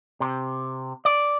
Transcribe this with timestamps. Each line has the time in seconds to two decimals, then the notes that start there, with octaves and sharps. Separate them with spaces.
0.20 C3
1.05 D5